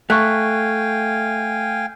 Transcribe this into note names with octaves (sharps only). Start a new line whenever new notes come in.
A3 F5 G5 G#5 C#6 F#6